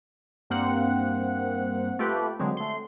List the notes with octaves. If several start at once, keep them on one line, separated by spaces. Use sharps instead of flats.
G2 A#3 C4 F#5
A3 F4 G4 B4
D3 F#3 G#3 C4
A3 C6